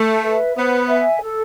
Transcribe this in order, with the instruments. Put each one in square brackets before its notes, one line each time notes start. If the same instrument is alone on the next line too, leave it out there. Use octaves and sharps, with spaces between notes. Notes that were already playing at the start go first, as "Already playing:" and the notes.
Already playing: [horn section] A3
[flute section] B4 E5
[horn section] B3 [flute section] C5
[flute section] E5 G#5
A4